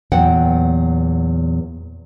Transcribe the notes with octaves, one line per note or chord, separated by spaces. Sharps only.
E2 A#2 F#3 B3 F#5 G5